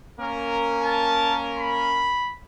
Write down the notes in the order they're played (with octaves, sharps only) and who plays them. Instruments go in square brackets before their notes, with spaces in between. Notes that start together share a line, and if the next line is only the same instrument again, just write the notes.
[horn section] A#3 C#4 A#4
[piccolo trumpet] A5
B5